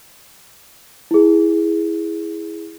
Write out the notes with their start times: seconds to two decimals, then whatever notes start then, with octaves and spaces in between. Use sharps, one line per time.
1.11 E4 G#4